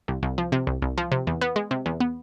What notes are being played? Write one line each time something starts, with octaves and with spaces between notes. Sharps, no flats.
C2
C2
F3
C3
C2
C2
F3
C3
E2
B3
G#3
C3
E2
B3